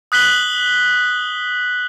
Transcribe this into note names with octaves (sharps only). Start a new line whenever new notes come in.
D#6 F#6 B6 F#7 G7